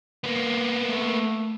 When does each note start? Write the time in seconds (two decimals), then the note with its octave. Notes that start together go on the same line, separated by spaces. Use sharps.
0.24 A#3 B3
0.84 A3